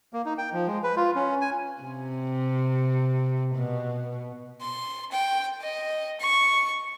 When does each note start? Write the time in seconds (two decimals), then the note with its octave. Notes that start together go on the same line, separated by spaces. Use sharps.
0.13 A#3
0.26 D#4
0.38 G5
0.53 F3
0.67 G#3
0.83 B4
0.97 F4
1.15 C#4
1.41 G#5
1.82 C3
3.55 B2
4.61 C6
5.11 G5
5.61 D#5
6.20 C#6